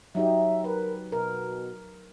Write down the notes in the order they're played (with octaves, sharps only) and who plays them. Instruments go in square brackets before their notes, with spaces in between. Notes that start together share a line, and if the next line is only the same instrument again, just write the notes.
[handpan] F#3 D#4 G4 [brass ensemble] E5
[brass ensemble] A#4 [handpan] B4
[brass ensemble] B2 [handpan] A#4